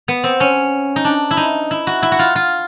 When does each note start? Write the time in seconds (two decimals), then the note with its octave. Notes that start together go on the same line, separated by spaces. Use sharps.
0.08 B3
0.24 C4
0.40 C#4
0.96 D#4
1.05 D4
1.31 E4
1.37 D#4
1.71 E4
1.87 F#4
2.03 E4
2.12 F#4
2.19 F4
2.35 F4